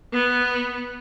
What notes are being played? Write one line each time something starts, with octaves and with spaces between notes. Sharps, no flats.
B3